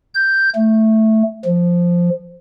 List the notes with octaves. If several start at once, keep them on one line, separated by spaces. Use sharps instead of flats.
G6
A3
F3